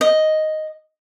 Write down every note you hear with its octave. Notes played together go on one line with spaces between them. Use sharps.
D#5